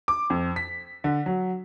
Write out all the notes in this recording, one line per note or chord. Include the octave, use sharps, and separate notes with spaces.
D6
F2
B6
D3
F#3